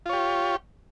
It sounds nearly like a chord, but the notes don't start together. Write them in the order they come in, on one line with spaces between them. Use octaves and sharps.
F4 C#5 G4